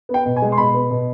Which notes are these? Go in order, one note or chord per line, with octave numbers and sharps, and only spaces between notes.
B3
G5
B2
G#5
G#3
C6
B2 B5
B3
B2